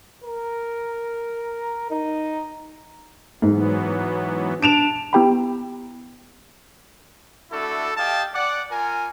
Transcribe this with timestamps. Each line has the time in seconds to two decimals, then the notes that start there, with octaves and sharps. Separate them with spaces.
0.24 A#4
1.91 D#4
3.42 G#2 E3 F#3 B3
4.62 D4 D7 E7 F7
5.13 B3 E4 G4 G5 A#5 B5
7.51 A3 D4 E4 F#4 A4
7.97 G4 D#5 F5 G5 A5
8.34 D5 F#5
8.72 F4 A#4 G#5